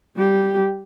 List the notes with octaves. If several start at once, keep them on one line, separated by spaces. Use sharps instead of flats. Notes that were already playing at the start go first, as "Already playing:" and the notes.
G3 G4